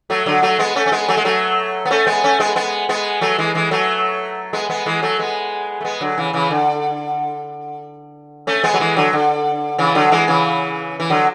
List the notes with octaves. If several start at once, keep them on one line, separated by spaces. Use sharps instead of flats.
F#3 A3
D3 F#3
F#3 A3
G#3 B3
A3 C#4
C#4
G#3 B3
F#3 A3
G#3
F#3 A3
B3
A3 C#4
G#3 B3
A3 C#4
G#3 B3
G#3 B3
G#3 B3
F#3 A3
E3 G#3
E3 G#3
F#3 A3
G#3 B3
G#3 B3
E3 G#3
F#3 A3
G#3 B3
A3
G#3 B3
D3 F#3
C#3 E3
C#3 E3
D3
A3 C#4
G#3 B3
F#3
E3 G#3
D3 F#3
D3
C#3 E3
D3 F#3
E3 G#3
C#3 E3
E3
D3 F#3